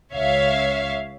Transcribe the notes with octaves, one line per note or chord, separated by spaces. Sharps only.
C#2 C#5 E5 F5